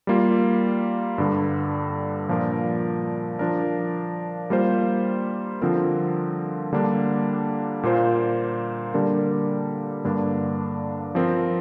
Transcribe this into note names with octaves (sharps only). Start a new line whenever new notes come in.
G3 A#3 F4
G2 D3 G3
A#2 F3 D4 A#4
F3 D4 A#4
G3 A#3 F4 C5
D3 F3 C4 F4 A#4
D3 G3 A#3 D4
A#2 A#3 F4 C5
D3 G3 A#3 D4 A#4
G2 D3 A#3 D4
F3 C4 A#4